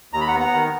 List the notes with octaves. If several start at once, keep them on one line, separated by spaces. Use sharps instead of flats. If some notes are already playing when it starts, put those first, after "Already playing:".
D#2 A#5
B5
F#5 A#5
B3
F#5 A#5
D#3